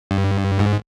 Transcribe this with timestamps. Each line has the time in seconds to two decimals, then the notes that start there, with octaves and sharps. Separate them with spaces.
0.11 G2
0.59 G#2